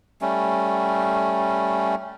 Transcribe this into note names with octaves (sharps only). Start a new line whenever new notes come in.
G3 A3 C#4